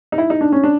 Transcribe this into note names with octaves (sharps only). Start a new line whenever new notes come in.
D#4
E4
D#4
D4
C#4
D4